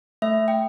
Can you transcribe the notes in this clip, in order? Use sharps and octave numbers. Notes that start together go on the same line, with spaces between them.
A3 E5
G5